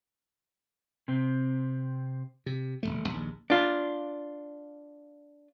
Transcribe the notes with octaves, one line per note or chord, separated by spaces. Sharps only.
C3 C4
C3
D#1 C2 A3
A#1 D#2
D4 F4